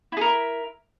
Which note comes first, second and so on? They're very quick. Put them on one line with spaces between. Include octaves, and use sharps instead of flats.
E4 G#4 A#4 E5